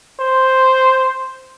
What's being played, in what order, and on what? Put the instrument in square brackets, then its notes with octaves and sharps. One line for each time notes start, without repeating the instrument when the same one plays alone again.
[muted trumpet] C5